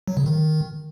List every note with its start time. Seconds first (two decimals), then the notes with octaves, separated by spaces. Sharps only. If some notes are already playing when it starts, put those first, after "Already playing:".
0.08 F#3
0.17 C#3
0.26 D#3